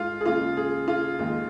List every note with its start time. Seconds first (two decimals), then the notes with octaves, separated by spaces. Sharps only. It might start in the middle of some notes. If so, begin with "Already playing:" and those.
Already playing: G#2 G#3 F4
0.21 G#4
0.25 D#2 C#3 G#3 F4
0.57 G#4
0.88 F4
1.19 D#2 D#3 G#3